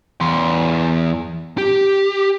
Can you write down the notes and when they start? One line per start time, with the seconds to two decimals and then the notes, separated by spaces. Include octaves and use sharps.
0.21 E2 C6
1.58 G4